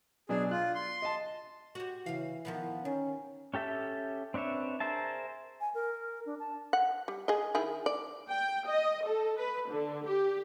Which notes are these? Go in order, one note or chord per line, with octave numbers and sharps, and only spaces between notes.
B2 F#3 D4 G#4
F4 F#6
C6
D#5 A5
F#4 G4
C#3 E3 F5
D#3 F3 B3
D#3 C#4
C#4 G4 A4 E5 G5
C4 D4 B4 C#5 E5
G#4 A#4 C5 E5 A5
G#5
A#4
D4
A5
F#5
G3
G#4 D#5
D#3 E4 G#4
D5
G5
D#5
A4
B4
D3
G4